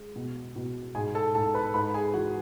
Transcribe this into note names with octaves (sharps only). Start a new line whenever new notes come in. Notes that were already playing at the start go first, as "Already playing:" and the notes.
Already playing: G#3
B2
B2
G#2 G#4 G#5
A4 A5
G#2 A4 A5
B4 B5
G#2 B4 B5
G#4 G#5
E3 F#4 F#5